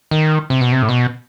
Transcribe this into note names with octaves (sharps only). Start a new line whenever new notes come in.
D#3
C3
B2
C3
A2
B2